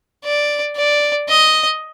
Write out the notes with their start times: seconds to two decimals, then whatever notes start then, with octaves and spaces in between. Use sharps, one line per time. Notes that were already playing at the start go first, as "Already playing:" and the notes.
0.25 D5
0.77 D5
1.29 D#5